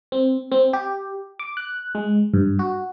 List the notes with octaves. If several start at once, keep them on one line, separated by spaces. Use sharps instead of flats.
C4
C4
G4
D6
F#6
G#3
G2
F#4